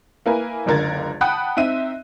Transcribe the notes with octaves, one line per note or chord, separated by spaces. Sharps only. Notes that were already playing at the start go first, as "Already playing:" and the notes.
A#3 E4 A#4 B4 G#5
F#1 C#2 D3 A#4 G#6 A6
F#5 G5 A5 B5 D#6 F#6
C4 D#4 E5 D#7